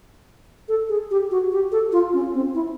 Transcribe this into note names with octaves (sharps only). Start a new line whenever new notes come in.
A4
G#4
G4
F#4
G4
A4
F4
C#4
C4
E4